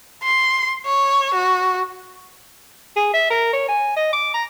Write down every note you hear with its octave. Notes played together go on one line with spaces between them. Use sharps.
C6
C#5
F#4
G#4
E5
A#4
C#5
G#5
D#5
D6
A#5